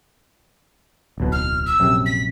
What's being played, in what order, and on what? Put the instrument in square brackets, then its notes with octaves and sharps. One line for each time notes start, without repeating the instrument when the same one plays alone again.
[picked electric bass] D1 B1 B2
[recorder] F6
E6
[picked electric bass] A#1 F#2 C3
[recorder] B6